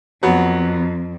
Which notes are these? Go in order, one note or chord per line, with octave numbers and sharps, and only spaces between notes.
F2 F#3 B3